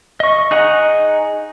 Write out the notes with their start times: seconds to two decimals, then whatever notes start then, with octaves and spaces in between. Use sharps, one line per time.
0.20 D#5 C#6
0.51 D#4 G#4 D#5 F#5 A#5